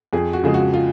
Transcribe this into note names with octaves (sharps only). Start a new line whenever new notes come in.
F2 G#4
F#4
C#3 F3 G#3 G#4
F#4
F4